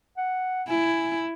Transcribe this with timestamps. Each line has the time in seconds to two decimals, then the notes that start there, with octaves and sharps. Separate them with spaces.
0.18 F#5
0.69 E4 G#5